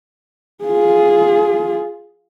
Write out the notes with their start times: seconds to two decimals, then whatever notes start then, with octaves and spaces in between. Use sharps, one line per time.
0.64 F4 G#4